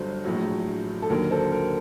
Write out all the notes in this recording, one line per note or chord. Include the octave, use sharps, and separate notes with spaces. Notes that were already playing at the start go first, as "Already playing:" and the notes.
Already playing: G1 G2 F#3 A4 C5
A#1 A2 F#3
A4
D#2 D3 F#3 A#4
A4 C5
A#4